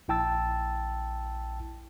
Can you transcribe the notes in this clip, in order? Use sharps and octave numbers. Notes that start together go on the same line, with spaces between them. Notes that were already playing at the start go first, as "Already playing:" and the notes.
A#1 E4 G5 A5 E6 A6